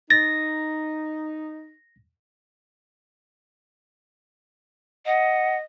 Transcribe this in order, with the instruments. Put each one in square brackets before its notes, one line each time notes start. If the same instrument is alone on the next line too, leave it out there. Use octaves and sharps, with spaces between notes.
[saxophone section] D#4 [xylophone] A6 [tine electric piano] A#6
[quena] D#5 [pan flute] F#5